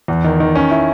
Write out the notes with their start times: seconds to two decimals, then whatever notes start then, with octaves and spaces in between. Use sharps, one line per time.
0.08 E2
0.24 D#3
0.40 D#3
0.55 C#4
0.71 E4